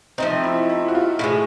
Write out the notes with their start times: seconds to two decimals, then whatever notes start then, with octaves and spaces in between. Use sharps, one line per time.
0.18 F3 A3 C4 D#4
0.43 E4
0.69 E4
0.88 F#4
0.95 F4
1.19 A2 F3 E4
1.24 G#3